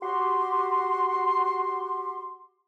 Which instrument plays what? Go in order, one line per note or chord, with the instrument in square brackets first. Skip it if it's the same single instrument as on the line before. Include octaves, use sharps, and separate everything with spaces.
[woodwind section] F#4 G4 C6